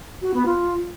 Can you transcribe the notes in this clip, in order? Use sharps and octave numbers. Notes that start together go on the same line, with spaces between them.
F#4
B3
F4